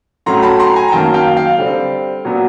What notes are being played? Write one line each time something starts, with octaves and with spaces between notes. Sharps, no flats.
A2 F#3 A3 C#4 A#5 C6
A5 B5
A#5 C6
G#5 A#5
A#5
F#2 D#3 F#3 A#3 C#4 G5 A5
F5 G5
F5 G5
D3 G3 C4
A#2 F#3 B3